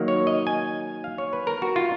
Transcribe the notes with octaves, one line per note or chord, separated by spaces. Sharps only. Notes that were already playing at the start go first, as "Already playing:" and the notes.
Already playing: D#3 F#3 A#3
C#5
D#5
G#5
F5
C#5
B4
A#4
F#4
F4